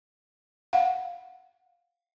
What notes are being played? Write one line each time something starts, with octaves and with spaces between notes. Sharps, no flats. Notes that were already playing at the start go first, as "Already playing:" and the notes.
F5 F#5